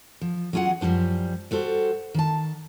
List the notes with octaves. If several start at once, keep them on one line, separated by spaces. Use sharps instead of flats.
F3
F#3 C#4 F4 G#4 F#5
F#2 F3 G3 D4 C5
G3 F#4 A4 C5
D#3 A5